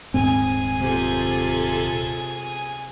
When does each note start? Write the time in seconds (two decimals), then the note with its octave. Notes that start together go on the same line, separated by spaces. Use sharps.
0.14 D#1 G#2 C4 G#4 G#5
0.79 C3 F4 A4